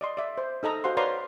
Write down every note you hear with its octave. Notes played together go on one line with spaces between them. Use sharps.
D5 D#5 C6
D5 E5
C5
D#4 A4 D#5 A#5
F#4 C5 F5 F#5 C6
B4 C#5 D5 F5 A#5 C6